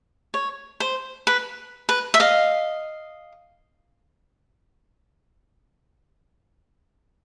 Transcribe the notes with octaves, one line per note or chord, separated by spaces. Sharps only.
C#5
C5
B4
B4
E5
D#5 F5